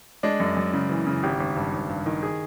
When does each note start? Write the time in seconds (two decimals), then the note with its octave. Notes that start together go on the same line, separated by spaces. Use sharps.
0.23 G#3 D4
0.40 F#2
0.57 F#2
0.73 C#3
0.89 E3
1.07 C#3
1.23 G#1 G4
1.40 G#1
1.56 G2
1.73 G#1
1.89 G2
2.06 D#3
2.23 G#4